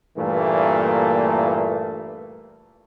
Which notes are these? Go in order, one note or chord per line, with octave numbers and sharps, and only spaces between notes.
G2 A#2 E3 A3 A#3